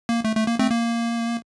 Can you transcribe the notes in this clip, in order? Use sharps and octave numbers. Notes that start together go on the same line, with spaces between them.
A#3
A3
A3
A#3
A3 C4
A#3